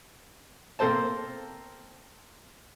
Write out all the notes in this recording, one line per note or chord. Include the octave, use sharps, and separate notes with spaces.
A#3 C4 A4 C5 A5